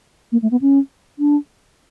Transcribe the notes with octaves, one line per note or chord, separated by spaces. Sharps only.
A#3
A3
B3
C#4
D4